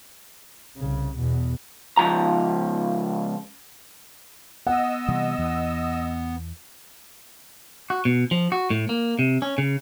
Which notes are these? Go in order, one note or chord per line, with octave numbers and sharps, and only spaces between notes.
C2 C#3
E2 B2
C#2 F3 A#5
B3 D#5 F#5 E6
C3 E3 G3
E2 E3
F#4
B2
F3
F#4
A2
A#3
C3
C#4
C#3